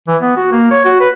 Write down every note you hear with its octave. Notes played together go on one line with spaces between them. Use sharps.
E3
B3
F#4
A#3
C#5
F#4
B4